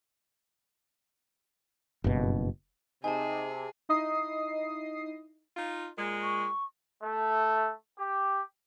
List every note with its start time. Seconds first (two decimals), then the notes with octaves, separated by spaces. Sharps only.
2.04 F#1 G2 B2
3.04 C3 D#4 G#4 G#5 A5
3.89 D#4 E4 D#5 D#6 C7
5.57 D#4 F4
5.97 A#2 G#3
6.23 C#6
7.03 A3
7.98 G4